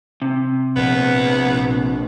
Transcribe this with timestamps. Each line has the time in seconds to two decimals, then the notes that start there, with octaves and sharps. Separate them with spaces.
0.22 C3
0.76 A#1 B3